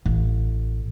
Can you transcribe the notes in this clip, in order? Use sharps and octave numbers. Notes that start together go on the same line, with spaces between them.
A1